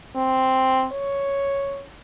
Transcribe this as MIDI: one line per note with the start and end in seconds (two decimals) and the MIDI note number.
0.15 0.87 60
0.92 1.84 73